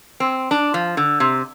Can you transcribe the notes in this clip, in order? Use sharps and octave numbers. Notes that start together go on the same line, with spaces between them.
C4
D4
F3
D3
C3